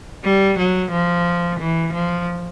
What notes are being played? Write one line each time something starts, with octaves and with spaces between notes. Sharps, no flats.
G3
F#3
F3
E3
F3